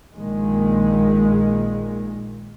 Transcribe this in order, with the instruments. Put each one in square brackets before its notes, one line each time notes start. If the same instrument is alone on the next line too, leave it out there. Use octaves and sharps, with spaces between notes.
[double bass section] A#1 A#2 D#3 G#3